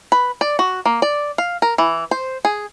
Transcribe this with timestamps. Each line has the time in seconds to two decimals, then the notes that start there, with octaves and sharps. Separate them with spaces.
0.12 B4
0.41 D5
0.59 F#4
0.86 A#3
1.02 D5
1.38 F5
1.62 A#4
1.78 E3
2.11 C5
2.45 G#4